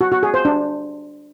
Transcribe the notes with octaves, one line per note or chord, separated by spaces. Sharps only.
F#4
F#4
G#4
C5
D4